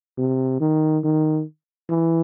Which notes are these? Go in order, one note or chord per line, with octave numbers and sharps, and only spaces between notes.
C3
D#3
D#3
E3